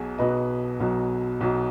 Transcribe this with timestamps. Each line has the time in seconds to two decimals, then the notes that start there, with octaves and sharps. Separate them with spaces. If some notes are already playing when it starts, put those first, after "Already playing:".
Already playing: B1 B2 F#3 G#4
0.18 B1 B2 F#3 B4 D#5
0.80 B1 B2 F#3
1.41 B1 B2 F#3